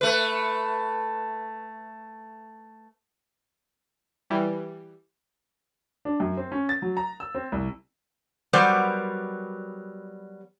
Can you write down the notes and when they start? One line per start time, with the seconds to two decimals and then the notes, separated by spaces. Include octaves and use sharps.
0.01 A3 B4
4.30 E3 G3
6.05 D4
6.20 F#2
6.37 C4
6.52 C#4
6.69 A6
6.82 F#3
6.97 A#5
7.20 E6
7.35 C4
7.52 C2
8.53 F#3 G3 B3 A#4 C5 D5